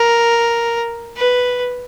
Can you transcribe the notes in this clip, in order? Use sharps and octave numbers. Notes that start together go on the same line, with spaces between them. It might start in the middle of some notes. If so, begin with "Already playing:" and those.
Already playing: A#4
B4